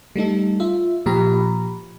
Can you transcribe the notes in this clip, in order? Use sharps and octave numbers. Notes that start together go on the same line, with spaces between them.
G3 A3 D#4 A4
F4 E5
A#2 F3 G4 A#5 B5